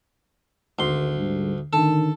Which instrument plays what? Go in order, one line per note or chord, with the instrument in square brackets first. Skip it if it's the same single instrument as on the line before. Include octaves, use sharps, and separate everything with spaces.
[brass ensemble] G#1 [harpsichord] D2 C6
[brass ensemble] G#2 D3 G3
[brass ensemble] A1 D3 D#3 [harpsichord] A4 A5